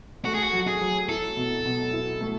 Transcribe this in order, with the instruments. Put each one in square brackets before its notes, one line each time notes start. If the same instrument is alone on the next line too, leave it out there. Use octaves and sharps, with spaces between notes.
[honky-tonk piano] A3 [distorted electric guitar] F#4
[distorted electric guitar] G#4
F#4
[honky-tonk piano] F#3
[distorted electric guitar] G#4
[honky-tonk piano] F#3
[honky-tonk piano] E4 [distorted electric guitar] A4
[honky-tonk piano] B2
B2
E4
A3